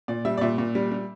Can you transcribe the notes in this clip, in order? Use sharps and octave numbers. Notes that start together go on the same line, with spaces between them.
A#2 D5
G3 E5
D5
A#2 E5
A#2
G3
G3